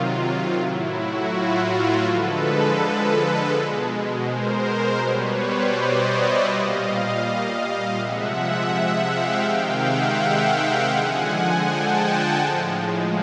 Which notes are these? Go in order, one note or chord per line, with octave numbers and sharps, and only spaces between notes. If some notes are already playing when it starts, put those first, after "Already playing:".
Already playing: C3 D#3 F#3 F4
A2 F#3 E4
E4 F#4
F4
D3 F3 G#3 A4 B4
B2 G#3
A#4 C5
B2 G3 B4 C#5
C5 D5
C#5 D#5
D5 E5
A#2 G3 D#5 F5
C3 F3 G#3 E5 F#5
E5 F#5
F5 G5
C3 D#3 G#3 F5 G5
E5 F#5
F5 G5
D3 F3 G#3 F#5 G#5
G5 A5
A2 F3 G#3